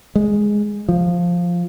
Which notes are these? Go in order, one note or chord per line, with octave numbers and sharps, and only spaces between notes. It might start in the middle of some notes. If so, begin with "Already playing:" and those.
G#3
F3